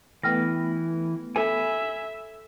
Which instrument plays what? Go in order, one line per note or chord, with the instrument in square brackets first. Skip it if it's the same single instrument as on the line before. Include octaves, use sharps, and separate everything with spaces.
[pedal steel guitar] E3 [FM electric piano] A3 B3 B4 [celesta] G5 F6 A#6
[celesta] A4 [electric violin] E5 [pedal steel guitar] G#5 B5